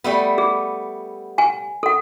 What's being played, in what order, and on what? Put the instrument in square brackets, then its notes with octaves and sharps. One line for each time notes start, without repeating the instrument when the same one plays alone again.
[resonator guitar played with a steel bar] G3 A3 B3
[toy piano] G#4
F#5 G#5
A4 F#5